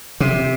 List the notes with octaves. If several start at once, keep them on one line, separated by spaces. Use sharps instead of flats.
C3